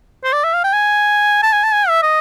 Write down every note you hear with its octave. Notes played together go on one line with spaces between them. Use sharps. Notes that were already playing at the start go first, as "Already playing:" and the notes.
C5
D5
E5
F5
G5
G#5
A5
G#5
A5
G#5
E5
D#5